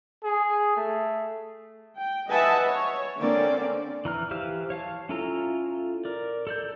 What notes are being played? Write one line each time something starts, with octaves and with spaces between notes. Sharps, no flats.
G#4
A3
G5
B4 D#5 E5 F#5 G#5 A5
C#5
D3 A#3 C4 C#4 D5
E3 A#5 F6
E3 G4 C5 F5 F6
C#5 F5 A5
C#4 E4 F4 A4 A#5
A#4 D5
A4 D5 G6